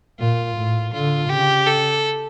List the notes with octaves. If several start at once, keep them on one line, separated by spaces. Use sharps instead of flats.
A#2 F4
A2
D3 F4
C#3 G4
A4